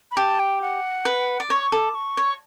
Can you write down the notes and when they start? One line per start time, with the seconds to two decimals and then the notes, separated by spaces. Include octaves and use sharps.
0.11 B5
0.17 G4 A5
0.39 G5
0.62 F#5
1.05 B4
1.40 D5
1.50 C#5 C#6
1.72 A4 D6
1.95 C#6
2.17 C#5